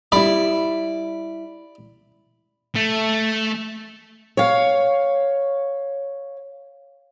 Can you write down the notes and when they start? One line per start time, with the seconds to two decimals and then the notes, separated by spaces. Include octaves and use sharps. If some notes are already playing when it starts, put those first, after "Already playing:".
0.12 G3 E4 D5 B5
2.75 A3
4.37 C#5 F5